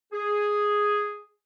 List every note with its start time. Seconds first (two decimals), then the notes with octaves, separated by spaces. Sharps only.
0.13 G#4